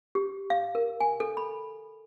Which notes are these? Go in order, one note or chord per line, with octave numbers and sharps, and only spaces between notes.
G4
F5
A#4
G#5
A4
B5